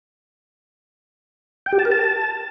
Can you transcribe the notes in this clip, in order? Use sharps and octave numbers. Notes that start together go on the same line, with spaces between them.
G5
G4
A5
A#4
A5